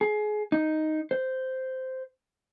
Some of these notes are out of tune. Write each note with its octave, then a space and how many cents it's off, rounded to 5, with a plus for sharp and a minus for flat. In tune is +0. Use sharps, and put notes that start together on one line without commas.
G#4 +25
D#4 +0
C5 -10